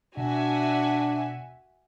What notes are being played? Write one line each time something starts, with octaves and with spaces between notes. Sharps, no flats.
B2 D4 F#4 E5 G#5